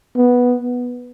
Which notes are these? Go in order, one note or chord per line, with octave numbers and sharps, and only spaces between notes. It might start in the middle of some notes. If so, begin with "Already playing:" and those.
B3